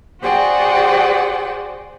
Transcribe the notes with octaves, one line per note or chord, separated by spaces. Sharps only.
F#4 G#4 C5 D5 F#5 G5